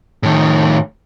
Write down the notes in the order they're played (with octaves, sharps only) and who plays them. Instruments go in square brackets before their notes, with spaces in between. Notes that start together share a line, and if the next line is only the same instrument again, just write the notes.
[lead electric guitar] A2 D#3